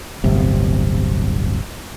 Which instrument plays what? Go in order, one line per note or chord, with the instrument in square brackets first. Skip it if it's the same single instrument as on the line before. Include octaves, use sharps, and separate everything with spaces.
[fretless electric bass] D1 G1 C3